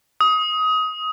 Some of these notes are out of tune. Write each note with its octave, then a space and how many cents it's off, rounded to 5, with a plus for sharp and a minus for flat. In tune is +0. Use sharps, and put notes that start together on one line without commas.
D#6 +20